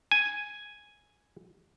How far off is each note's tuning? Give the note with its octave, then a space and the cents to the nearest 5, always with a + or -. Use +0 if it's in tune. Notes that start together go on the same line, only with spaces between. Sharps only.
G#5 +0